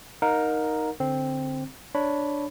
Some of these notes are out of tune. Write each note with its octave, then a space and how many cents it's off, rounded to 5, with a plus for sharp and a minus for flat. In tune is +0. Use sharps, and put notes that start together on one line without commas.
D#4 +0 A#4 +0 F#5 -45
D3 +0 C4 +0
D4 +0 C#5 +0 B5 +0